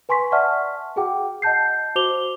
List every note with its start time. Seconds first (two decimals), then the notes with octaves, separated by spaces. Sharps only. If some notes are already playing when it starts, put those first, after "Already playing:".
0.09 B4 G#5 C6 C#6 B6
0.32 D5 E5 F#5 A5 C#6 F6
0.96 F#4 G#4 F#5 G5 D6
1.42 D#5 F#5 A5 G6 C7
1.95 F#4 C5 D6 F7 G7